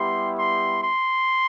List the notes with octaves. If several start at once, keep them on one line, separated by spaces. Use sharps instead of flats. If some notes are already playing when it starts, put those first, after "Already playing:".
Already playing: G3 B3 E4 G4 C6
C6
C6